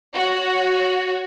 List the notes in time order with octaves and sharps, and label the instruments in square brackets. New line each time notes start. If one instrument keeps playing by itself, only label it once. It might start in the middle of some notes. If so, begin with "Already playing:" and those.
[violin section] F#4 C#5